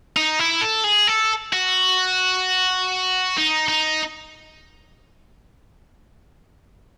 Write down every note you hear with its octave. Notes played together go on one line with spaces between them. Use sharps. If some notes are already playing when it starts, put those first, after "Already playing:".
D#4
E4
A4
G#4
A4
F#4
D#4
D#4